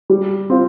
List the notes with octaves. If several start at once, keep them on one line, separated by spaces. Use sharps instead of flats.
G3
C4 F4